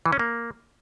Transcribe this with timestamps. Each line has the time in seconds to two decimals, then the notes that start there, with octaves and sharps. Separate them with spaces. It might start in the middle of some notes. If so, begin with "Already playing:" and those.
0.06 E3
0.13 C#4
0.19 A#3